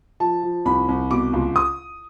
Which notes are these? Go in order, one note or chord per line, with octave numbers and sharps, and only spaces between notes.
F3 A5
F3
C2 B5
C2
B2 D6
C#2
D#6